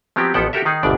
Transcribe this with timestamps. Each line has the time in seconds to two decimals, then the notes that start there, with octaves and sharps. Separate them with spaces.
0.16 F3 F#3 B3 C4 G4
0.34 A1 F3 B3 A4 F#5 G5
0.53 F#4 G4 A4 A#4 E5
0.65 D#3 D#4 G#4
0.83 G1 D2 G#2 B2 D4 D5